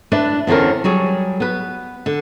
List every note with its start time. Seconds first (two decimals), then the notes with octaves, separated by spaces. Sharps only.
0.12 D4 E4 B4 D5
0.47 E2 D3 C4 C#4 A#4
0.84 F#3 G3 G#4 C#5
1.40 B3 B4
2.06 D3